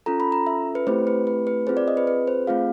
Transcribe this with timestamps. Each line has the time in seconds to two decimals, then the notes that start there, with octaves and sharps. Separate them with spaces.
0.06 C#4 F4 A4 A#5
0.20 B5
0.32 A#5
0.47 E5
0.75 B4
0.87 A3 C4 E4 G4 C5
1.07 B4
1.27 B4
1.47 B4
1.67 C4 F4 G#4 C5
1.77 D5
1.88 D#5
1.97 B4
2.07 B4
2.27 C5
2.47 A3 C4 F4 G#4 F5